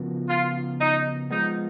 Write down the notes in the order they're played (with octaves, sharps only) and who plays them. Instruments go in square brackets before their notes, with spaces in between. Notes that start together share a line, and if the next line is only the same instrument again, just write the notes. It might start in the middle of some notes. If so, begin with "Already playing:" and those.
Already playing: [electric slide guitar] C#3 F3 B3 F#4 A#4
[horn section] F4
D#4
[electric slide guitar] F3 G#3 B3 [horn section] D#4